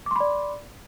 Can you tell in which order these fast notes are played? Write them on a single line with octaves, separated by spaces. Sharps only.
D6 C6 B5 D5